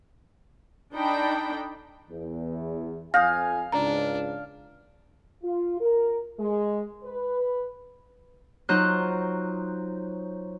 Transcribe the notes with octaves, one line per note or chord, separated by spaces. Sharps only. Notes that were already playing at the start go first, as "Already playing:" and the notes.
D4 D#4 A4 G5 B5
E2
F2 F5 G#5 D#6 G6 A#6
C#2 G#2 D4 A#5
F4
A#4
G#3
B4
F#3 D#4 F4 C5 F#6